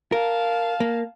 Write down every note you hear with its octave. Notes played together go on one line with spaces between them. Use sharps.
A#4 F5 A5
A#3